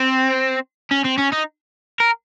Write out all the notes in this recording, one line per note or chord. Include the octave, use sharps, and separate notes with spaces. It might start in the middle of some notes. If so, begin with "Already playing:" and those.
Already playing: C4
C#4
C4
C#4
D#4
A#4